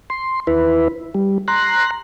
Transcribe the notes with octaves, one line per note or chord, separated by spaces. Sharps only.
C6
D#2 E4 B4
G3
A#5 C6 F#6